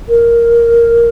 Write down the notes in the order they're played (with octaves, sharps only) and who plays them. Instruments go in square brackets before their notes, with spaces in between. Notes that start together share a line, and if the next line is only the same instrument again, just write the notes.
[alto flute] A#4